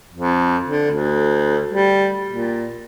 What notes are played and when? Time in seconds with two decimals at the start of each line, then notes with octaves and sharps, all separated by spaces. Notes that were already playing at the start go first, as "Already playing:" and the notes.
0.13 F2
0.65 D3
0.91 D2
1.71 G3
2.29 A#2